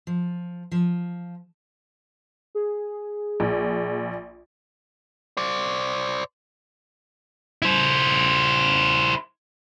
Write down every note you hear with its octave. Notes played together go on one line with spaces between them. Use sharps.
F3
F3
G#4
A#1
C5 D5
E4 C5